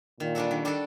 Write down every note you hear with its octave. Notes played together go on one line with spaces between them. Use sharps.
A#2 D#3
G3 D4 F#4 A4
D#3
G3 D4 F#4 A4